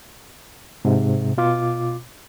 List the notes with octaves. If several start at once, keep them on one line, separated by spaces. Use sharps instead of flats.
G#2 C3
B2 F4 D6